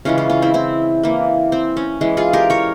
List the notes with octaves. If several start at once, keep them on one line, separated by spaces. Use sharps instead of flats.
C#3 E3 G#3 C#4 F4
C#4 F4
C#4 F4
C4 E4
C4 E4
E3 A#3
C4
C#4
E3 G#3
F4 G#4
G4 A#4
A#4 C#5